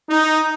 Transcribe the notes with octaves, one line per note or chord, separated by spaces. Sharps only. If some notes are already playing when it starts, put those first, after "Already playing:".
D#4